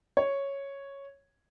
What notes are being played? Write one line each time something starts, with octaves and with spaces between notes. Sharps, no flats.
C#5